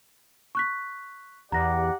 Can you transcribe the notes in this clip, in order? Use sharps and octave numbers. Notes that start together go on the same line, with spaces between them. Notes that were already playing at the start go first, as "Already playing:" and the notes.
C#6 F#6 B6
E2 G4 D5 F#5 A#5 A#6